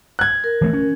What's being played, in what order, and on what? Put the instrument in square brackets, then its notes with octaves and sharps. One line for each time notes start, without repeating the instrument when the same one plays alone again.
[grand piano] F#6 G#6
[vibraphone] A#4
[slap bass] E3 A3 B3
C#4